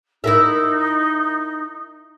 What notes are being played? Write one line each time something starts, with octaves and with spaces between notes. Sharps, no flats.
D#4 E4 A#4 E5